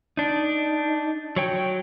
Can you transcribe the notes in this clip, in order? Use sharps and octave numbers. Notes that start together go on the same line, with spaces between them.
D4 D#4
F#3 C#5 G5